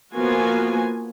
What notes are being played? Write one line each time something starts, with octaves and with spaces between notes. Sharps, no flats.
F3 A#3 B3 F4 F#4 G#5